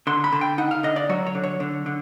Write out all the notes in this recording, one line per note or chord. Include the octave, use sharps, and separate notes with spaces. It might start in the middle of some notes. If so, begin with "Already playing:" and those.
D3 C6
B5
D3
G5
D#4 F#5
F5
D3 D#5
D5
F#3 C#5
C#5
D3
C#5
D3
D3